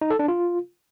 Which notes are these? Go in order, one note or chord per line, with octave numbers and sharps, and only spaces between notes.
D#4
A4
D4
F4